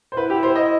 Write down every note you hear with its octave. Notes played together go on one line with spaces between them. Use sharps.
C5
E4 B4
G4
C5
D#5